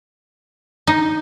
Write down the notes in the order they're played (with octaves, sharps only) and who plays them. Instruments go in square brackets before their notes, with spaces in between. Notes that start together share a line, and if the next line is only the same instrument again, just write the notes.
[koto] D#4